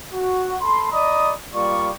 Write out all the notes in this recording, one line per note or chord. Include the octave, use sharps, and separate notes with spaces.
F#4
A4 B5 C6
D5 D#5 A#5 B5 D#6
G3 A#3 F4 D5 C#6